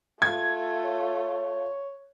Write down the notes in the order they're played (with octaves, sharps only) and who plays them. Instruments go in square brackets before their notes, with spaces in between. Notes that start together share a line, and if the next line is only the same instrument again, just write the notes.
[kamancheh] A3 F4 [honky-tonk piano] G#6
[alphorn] C#5